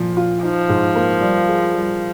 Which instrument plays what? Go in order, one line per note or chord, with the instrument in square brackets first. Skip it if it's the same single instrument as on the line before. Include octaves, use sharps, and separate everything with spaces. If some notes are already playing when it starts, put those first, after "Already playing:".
Already playing: [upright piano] A#2 F3
F4
[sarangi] F3 [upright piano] D#4
[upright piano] G#2
A#3
G3
G#4
G3